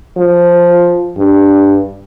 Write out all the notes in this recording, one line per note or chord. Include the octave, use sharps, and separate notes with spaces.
F3
G2